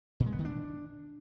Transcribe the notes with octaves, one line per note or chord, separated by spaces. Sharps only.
A#2
G#3
B3
D#3
D4